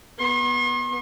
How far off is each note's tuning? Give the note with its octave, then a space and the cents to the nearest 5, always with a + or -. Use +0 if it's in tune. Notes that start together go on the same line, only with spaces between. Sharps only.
B3 -15 C6 +45